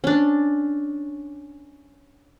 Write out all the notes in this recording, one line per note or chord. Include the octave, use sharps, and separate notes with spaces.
C#4 D4